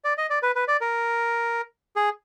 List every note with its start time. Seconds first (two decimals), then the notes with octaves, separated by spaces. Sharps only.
0.04 D5
0.18 D#5
0.30 D5
0.43 B4
0.55 B4
0.68 D5
0.81 A#4
1.96 G#4